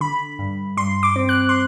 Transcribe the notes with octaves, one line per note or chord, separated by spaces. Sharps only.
D3 B5
G2
G2 C6
D6
C4
F#6
C6